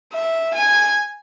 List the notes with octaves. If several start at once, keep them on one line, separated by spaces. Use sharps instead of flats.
E5
G#5